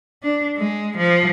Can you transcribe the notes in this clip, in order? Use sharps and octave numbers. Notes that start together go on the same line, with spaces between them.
D4
G#3
F3